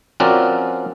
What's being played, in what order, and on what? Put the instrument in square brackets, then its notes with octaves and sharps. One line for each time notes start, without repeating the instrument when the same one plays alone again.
[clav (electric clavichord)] F3 C4 C#4 F#4 A#4 D5